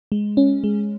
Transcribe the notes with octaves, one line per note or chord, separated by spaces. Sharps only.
G#3
C#4
G#3